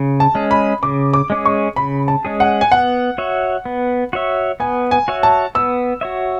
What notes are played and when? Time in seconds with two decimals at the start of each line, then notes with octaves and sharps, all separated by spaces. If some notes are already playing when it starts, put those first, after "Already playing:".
Already playing: C#3
0.20 A5
0.35 G#3 C#4 G#4
0.51 B5
0.83 C#3 D6
1.14 D6
1.30 G#3 C#4 G#4
1.45 C#6
1.76 C#3 B5
2.08 A5
2.25 G#3 C#4 G#4
2.40 F#5
2.61 G#5
2.72 B3 F#5
3.18 F#4 C#5 E5
3.65 B3
4.13 F#4 C#5 E5
4.60 B3 G#5
4.91 G#5
5.08 F#4 C#5 E5
5.23 A5
5.55 B3 E6
6.01 F#4 C#5 E5